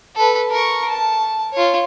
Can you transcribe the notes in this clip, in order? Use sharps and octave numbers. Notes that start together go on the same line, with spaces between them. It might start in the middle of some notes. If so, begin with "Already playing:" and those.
A4 B4
A#4 C#6
A5
F4 C#5